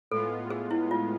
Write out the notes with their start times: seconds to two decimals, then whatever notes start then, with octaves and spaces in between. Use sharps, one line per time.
0.11 A2 G#3 B3 F4 A4
0.50 G#4
0.71 E4
0.91 F4